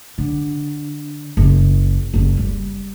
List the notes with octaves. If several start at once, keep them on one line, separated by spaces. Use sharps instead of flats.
D3
F#1
F#1
G3